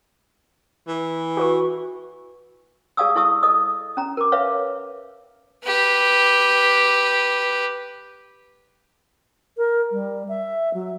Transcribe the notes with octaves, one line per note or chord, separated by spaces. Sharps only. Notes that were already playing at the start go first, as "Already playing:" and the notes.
E3
F#4 B4 C#6
G#4 D5 F5 A5 D#6 E6
E4 A4 A5 C#6 D#6 E6
A4 D#5 D#6
C#4 A#5
A#4 D6
B4 C#5 E5 F5
G4 B4
A#4
G3
E5
F#3